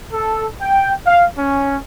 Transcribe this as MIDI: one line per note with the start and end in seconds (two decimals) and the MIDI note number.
0.13 0.46 69
0.61 0.93 79
1.07 1.25 77
1.37 1.77 61